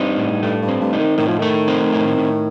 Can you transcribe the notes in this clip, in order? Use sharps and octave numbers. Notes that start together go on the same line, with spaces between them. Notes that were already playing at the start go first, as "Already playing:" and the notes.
Already playing: G2 C4 D#4
A2
G2 A3
G2
C4
G2
D#4
D#3
A2 D#3
F3
D#3 A3
C4
A2
A2